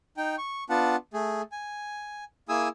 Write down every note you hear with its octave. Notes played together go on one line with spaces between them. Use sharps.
D#4 G5
C#6
B3 D4 F4 F#5 A5
A3 G#4
G#5
A#3 E4 G#4 G#5 D#6 E6